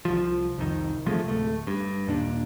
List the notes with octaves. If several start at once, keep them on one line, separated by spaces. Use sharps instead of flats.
C2 F3
C2 F2 D#3
C3 F3 G#3 A3
D1 A3
G2
D#2 A#2 D4